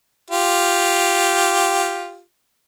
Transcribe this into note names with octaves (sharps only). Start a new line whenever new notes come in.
F4 G4